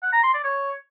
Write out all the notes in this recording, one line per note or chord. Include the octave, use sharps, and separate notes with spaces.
F#5
A#5
C6
D5
C#5